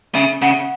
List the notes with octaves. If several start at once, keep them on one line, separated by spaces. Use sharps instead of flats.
C#3 E5
C#3 F#5